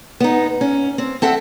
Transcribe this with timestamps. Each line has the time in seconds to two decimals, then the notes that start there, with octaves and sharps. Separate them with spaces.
0.20 B3 D#4
0.61 C#4
0.98 C4
1.22 C4 A4 E5 F#5